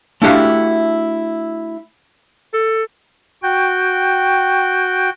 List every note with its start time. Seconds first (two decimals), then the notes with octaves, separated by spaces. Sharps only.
0.22 A3 D4 E4 F#4 G4 F5
2.54 A4
3.43 F#4 G5